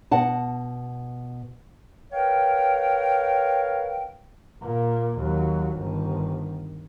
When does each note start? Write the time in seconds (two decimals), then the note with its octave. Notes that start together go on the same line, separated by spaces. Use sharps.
0.11 B2 F#5 A5
2.12 A#4 B4 C#5 F5 G5
4.62 A#2 A#3
5.18 D#2 F#3
5.77 G1 D#3